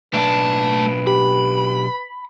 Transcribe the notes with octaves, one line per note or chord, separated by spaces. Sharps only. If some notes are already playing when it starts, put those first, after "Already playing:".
B1 A3 D4 B4 A5
G4 B5